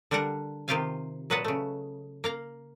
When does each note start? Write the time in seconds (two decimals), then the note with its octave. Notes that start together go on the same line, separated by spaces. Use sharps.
0.11 D3 G3 D4 A#4 F#5 A#5
0.68 C3 D#3 F4 G4 F5 G#5
1.30 A#2 F#3 B4 D#5 F#5 A5
1.44 C#3 A3
2.24 A#3 F5 A#5